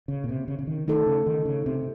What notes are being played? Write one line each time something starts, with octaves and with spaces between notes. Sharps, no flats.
C#3
A#2
C3
C#3
C#3
D#3
D#3 A3 D#4 A4
C#3
D#3
C#3
C3